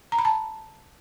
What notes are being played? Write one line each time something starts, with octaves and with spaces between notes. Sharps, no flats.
A#5
B5
A5